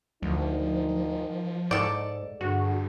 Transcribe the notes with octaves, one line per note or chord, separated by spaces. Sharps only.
D2 G#2 D#3 F3 D#4
F3
G#2 A4 D5
G2 D3 F#4 G#4